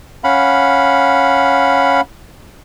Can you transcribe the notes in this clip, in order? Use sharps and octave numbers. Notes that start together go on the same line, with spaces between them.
C#4 F5 F#5 B5